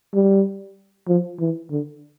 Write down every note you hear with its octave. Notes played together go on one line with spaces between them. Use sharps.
G3
F3
E3
D3